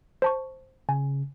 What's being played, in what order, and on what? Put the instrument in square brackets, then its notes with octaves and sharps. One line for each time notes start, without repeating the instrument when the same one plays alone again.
[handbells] C5 A5 C#6
[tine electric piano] C#3 [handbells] G#5